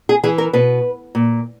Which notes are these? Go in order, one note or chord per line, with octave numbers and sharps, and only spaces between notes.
G#4
E3 G#4
A#4
B2 B4
A#2